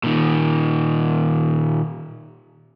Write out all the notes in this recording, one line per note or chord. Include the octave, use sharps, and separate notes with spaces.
A#2 D#3